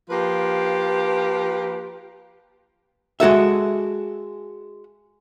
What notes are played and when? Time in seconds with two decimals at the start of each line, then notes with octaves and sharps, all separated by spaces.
0.10 F3 A#3 F4 G4 B4
3.20 G#3 F#4 A4 E5